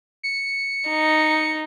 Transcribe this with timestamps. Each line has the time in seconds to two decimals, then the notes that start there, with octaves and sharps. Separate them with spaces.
0.23 C#7
0.87 D#4